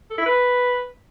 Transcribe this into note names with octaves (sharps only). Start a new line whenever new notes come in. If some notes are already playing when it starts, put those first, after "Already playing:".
A4
E4
B4